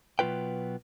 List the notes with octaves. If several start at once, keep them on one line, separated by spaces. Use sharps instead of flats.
B2 F#3 B3 F4 B4 G5